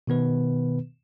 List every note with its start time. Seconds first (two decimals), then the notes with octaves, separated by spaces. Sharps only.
0.07 B2 D#3 B3 B4